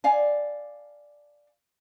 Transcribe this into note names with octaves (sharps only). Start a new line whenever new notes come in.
D5 F5 G#5